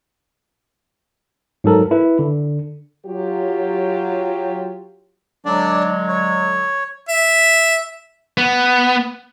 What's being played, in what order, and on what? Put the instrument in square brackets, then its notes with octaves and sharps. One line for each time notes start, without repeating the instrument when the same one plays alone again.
[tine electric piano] G#2 F#3 A4 A#4
E4 B4
D3
[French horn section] F#3 F4 G4
[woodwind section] D3 F#3 G#3 [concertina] D4 D5
[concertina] C#5
[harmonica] E5
[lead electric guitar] B3